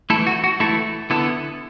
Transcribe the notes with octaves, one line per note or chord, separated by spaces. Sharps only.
E3 A3 E4 A4
F#4
F#4
E3 A3 E4 A4
D3 B3 E4 A4